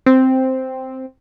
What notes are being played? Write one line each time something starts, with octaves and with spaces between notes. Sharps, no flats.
C4